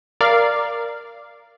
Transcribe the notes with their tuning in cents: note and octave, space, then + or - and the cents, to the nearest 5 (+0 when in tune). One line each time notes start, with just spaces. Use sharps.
A#4 +0 D5 +0 F5 -15